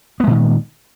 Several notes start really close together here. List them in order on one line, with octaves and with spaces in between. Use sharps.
B3 G#3 A#2 D#3